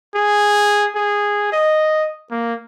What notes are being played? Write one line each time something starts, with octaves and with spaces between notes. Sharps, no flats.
G#4
G#4
D#5
A#3